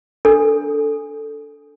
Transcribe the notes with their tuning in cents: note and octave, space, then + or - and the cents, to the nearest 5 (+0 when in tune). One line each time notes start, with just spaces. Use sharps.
D4 -15 A4 +0